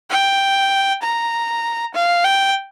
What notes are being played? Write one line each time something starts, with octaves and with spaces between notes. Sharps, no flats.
G5
A#5
F5
G5